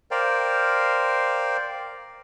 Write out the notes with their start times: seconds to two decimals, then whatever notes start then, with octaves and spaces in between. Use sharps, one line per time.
0.11 A#4 C5 D5 F5 G5